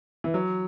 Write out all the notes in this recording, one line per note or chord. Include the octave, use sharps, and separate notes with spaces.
E3
F#3